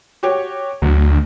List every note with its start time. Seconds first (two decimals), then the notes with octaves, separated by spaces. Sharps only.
0.23 F#4 G4 C#5
0.82 D2 F#3